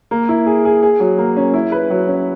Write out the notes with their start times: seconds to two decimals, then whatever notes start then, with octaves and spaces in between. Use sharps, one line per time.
0.11 A#3
0.29 E4
0.46 G#4
0.65 G#4
0.82 G#4
1.00 F#3
1.18 A#3
1.37 C#4
1.54 E4
1.72 B4
1.90 F#3
2.08 C#4